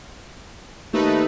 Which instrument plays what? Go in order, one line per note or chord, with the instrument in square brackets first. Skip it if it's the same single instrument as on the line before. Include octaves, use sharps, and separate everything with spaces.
[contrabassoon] D#2 [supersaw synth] A3 D#4 B4